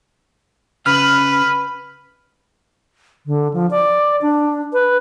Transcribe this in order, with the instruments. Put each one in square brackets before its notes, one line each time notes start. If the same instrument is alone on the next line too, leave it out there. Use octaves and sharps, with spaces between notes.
[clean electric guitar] C#3 B5 [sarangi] B4 [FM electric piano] F6
[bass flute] D3
F3
D5
D4
B4